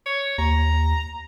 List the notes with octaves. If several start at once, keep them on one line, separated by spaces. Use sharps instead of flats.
C#5
D#2 A#5